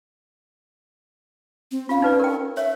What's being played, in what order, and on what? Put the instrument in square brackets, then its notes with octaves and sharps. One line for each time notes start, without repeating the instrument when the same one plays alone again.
[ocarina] C4
[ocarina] C#4 [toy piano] F4 F5
[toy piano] D#4 B4 D5
A#4 G5
[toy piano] C#5 [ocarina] E5